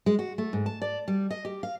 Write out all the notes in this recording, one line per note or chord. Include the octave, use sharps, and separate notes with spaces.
G#3
F#4
A3
G#2
A5
D5
G3
D#5
G4
F5